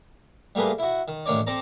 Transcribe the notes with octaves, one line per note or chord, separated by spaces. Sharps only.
G3 A3 A#3 G#4 B4
E4 F#4
D#3
A1 D#3 D4 C#5 D5
C4 A4 D5 A5 A#5